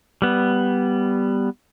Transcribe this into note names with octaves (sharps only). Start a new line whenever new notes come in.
G3 B3